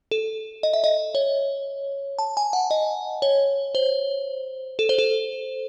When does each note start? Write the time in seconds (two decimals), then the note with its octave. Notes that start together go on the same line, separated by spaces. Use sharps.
0.11 A4
0.63 D#5
0.73 E5
0.84 D#5
1.15 C#5
2.19 A5
2.37 G#5
2.53 F#5
2.71 D#5
3.22 C#5
3.75 C5
4.79 A4
4.89 C5
4.98 A4